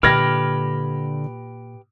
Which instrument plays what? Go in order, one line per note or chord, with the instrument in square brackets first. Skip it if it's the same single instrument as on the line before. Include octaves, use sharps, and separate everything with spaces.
[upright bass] A#2 [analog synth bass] D3 [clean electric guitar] G4 B4 [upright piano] F6 G#6 A#6